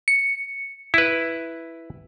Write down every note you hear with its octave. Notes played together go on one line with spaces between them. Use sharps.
C#7
E4 B4